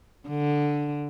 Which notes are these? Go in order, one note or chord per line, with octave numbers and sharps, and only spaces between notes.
D3